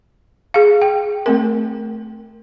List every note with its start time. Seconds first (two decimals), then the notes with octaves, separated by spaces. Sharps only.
0.54 G#4 F5
0.82 G5
1.26 A3 C4 A#4